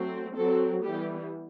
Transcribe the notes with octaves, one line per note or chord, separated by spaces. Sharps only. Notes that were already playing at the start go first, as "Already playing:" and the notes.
Already playing: F#3 A3 C4
F#3 C4 A4
E3 G3 B3 G4